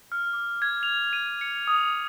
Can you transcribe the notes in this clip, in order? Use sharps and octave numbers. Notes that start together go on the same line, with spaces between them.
F6
D6
G#6
F7
D#7
C#7
D#6